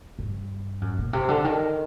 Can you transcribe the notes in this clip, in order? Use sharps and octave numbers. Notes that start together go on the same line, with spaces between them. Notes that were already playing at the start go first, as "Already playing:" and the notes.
G2
F#2
A#2
C3
D3
D#3